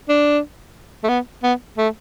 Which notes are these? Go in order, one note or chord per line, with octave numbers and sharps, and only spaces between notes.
D4
A3
B3
B3
A3